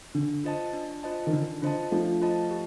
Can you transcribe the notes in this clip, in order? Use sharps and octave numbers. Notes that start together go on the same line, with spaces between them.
D3 D4
F4 C5 D#5 A5
D4
F4 C5 D#5 A5
D#3
D3 D4
D3 F4 C5 D#5 A5
F3 A3 D4
F4 C5 D#5 A5
G4